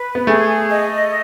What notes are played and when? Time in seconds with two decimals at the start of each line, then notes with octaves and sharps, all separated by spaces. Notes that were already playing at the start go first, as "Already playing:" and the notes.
Already playing: B4
0.15 B3
0.27 A3 G#4
0.69 D#5